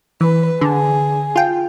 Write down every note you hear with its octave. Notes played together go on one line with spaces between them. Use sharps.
E3 B4
D3 G#4
F4 G5